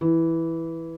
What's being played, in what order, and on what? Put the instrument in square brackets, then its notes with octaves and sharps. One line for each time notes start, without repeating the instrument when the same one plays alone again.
[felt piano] E3